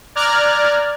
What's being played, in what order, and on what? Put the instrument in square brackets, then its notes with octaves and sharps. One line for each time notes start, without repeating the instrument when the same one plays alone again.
[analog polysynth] D5 A#5 F6 F#6 G#6